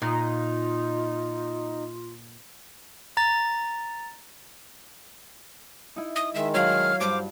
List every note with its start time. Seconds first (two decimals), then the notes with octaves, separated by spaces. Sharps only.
0.02 A#2 D#4 F4
3.17 A#5 A6
5.96 D#4 E4
6.16 D#6
6.35 D#3 G#3 E5
6.54 F#3 C#5 F5 F6
7.01 G2 C5 F5 D6